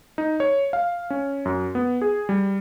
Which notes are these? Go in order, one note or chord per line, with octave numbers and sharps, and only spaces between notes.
D#4
C#5
F5
C#4
F#2
B3
G#4
G3